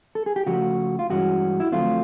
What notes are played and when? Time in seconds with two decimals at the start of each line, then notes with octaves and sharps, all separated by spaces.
0.15 A4
0.26 G#4
0.36 G4
0.46 C#3 F3 A3 F#4
0.99 F4
1.09 G2 E3 G#3 C#4 F#4
1.60 E4
1.72 F2 D3 F#3 A3 C4 F4